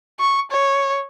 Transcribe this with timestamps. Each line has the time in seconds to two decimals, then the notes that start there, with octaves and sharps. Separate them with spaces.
0.20 C#6
0.51 C#5